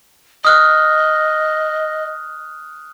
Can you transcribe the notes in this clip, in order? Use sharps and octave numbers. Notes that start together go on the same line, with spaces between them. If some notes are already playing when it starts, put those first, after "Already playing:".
D#5 D#6 F6 F#6